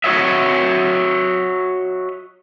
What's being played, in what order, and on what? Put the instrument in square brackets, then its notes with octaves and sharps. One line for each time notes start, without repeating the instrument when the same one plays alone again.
[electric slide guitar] F#4 C#5 D#5 E5